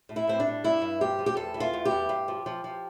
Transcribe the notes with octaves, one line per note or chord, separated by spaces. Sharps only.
A2
E4
A2 C4
D4
G3
G2 E4
G2
F3 G4
F3
G4
E2 A4
E3
F4
E2
G4
E2
G2
F3
F3
F3